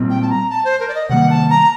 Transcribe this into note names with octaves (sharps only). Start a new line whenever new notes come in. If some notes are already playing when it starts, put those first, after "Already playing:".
Already playing: A#2 G3 C4
G5
A5
A#5
A5
C5
A#4
D5
D#5
C3 D#3 G3 A#3 F#5
A5
A#5